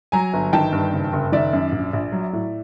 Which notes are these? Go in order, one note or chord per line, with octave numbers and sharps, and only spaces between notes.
F#3 G#5 A#5
G1
D#3 G5 A5
G2
F#1
F#1
D#3 D5 E5
F#2
A#1
A#1
F#3
A2